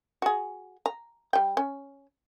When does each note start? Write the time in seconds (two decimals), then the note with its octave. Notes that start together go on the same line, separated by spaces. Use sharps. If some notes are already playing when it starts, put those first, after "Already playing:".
0.22 F#4 G#4
0.86 A#5
1.33 G3 G5
1.57 C#4